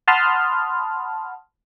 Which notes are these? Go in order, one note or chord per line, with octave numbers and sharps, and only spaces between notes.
F#5 A5 B5 C6 D#6 F6